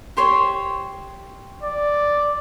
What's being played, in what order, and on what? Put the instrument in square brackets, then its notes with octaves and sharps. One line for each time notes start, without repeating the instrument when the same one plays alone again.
[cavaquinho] G4 C5 C#5
[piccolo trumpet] D5